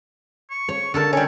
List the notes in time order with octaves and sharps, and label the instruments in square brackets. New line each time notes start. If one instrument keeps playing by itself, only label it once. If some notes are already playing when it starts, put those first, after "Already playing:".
[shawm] C#6
[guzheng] C#5
[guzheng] D3 A4 A#4 [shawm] A5
[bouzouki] G3 C#4 [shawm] C#5